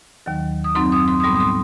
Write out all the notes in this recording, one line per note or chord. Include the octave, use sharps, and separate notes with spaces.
D#2 D#3 F#3
D#6
F#2 F#3 C4 D#4 C6
D#6
C6
D#6
A2 G3 B3 C6
D#6
C6